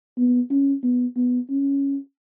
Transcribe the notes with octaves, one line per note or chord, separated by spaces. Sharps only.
B3
C#4
B3
B3
C#4